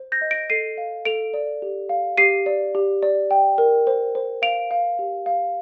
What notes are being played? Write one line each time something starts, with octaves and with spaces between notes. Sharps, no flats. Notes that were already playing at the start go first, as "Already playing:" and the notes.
Already playing: C5
G6 A#6
D#5
A#6 D7
A4 C7 D#7
F5
A4 D7 F7
D5
G4
F5
G4 C7 D#7
D5
G4
D5
G5
A#4
C5
C5
F5 D7 F7
F5
G4
F5